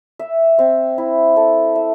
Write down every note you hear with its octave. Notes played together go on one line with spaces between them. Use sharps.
E5
C4
E4
A4
E5